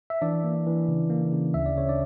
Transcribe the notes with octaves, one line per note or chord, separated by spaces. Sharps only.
E5
E3 D4 D5
A#3
E3
C#3
A#3
C#3
D2 E5
D5
C#3 C#5
D4 D5